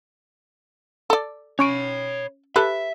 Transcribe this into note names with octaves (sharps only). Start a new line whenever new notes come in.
A4 D5
C#4 C#5 B5 C#6 D7
G4 A4 B4 E5 F#6